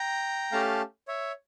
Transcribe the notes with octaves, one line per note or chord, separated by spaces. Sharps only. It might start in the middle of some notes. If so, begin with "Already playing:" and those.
Already playing: G5 A#5
A3 C#4 G4 F5 A5
C#5 E5